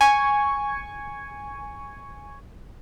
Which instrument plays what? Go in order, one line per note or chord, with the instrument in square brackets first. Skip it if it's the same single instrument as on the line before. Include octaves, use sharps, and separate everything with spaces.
[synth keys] G#5 C#6